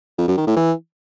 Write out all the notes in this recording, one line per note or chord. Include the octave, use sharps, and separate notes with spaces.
F2
F#2
D#3
A2
E3